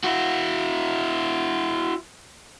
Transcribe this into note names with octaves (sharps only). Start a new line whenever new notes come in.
E4 F#4